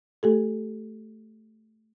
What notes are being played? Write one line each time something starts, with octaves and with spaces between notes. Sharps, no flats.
A3 G4 A4